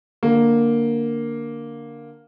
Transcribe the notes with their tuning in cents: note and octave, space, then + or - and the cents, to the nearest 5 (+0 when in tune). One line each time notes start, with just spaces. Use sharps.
D3 +0 A#3 +0